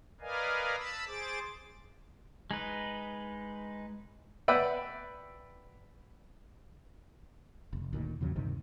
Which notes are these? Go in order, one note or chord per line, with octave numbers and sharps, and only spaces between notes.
A#4 B4 D5 D#5 F5 G#5
A5 B5 E6
G#4 C5 D6 A6
G#3 D#4 B4
B4 D5 E5 F#5 G5 B5
F1
D2 A#2 D#3
E2 A#2 C#3 F#3
D2 G2 C3 D#3